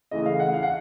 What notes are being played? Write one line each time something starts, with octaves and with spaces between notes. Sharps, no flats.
C#3 E3 A3 D#5
F5
F#5
F5
F#5